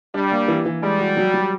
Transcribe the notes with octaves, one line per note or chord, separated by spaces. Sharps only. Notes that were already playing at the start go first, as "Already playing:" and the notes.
G3 D4
A#3
E3
E3
G3 G#3
F#4
F#3
F#3